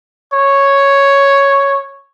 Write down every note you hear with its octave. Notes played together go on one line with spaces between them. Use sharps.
C#5